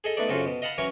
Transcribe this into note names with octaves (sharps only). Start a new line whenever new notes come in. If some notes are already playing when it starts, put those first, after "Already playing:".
G#4 A4 D#5
A3 B3 D4 D#4 D5
F#2 C#3 C4 F4 F#4 A4
B2
D#5 F5 F#5 A5 B5
E3 F#3 C#4 A#4 C#5 C#6